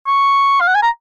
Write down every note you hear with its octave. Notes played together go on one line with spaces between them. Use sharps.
C#6
F5
F#5
G#5
A#5